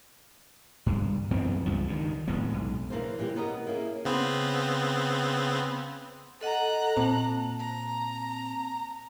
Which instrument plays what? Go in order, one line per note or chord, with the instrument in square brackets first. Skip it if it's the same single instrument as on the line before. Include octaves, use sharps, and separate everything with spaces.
[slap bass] G2
F#2 E3 B3 C4
C#2 G2 F3
G2 D#3
F2 A2 G#3 B3
B1
[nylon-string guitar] C#3 E3 A#3 D4 C5
A#2 E3 G3 A#3 G4
B2 B3 A#4 B4 D5 D#5
A#3 C#4 E4 G#4
[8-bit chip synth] C#3 B3 C4
[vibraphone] A4 D#5 F#5 [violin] A#5 F#6
[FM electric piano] A#2 C4 [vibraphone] A5
[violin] A#5